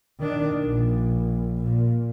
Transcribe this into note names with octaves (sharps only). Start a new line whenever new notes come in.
D#3 D4
A#1
A#2